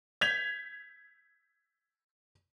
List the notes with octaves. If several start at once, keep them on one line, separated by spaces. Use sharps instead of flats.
G6 G#6 B6 F7